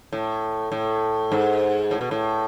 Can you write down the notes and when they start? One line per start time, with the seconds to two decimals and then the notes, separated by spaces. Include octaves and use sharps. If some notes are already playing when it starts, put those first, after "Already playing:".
0.12 A2
0.72 A2
1.32 G#2
1.91 A2
2.01 B2
2.11 A2